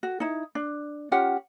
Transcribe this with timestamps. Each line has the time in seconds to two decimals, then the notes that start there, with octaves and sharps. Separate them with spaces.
0.03 F#4
0.20 D#4 E4
0.55 D4
1.11 C#4 F4 G4 F#5